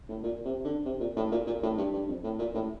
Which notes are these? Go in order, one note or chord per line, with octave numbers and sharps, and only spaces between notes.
A2
A#2
C3
D3
C3
A#2
A2
A#2
A#2
A2
G2
G2
F2
A2
A#2
A2